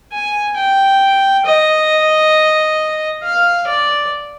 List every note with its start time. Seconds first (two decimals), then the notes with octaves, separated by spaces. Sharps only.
0.12 G#5
0.57 G5
1.46 D#5
3.23 F5
3.67 D5